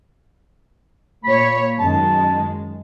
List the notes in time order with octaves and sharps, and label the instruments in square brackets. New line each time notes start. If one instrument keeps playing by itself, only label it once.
[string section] A#2 C#5 [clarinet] B5
[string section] F#2 D#3 G#3 [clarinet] A5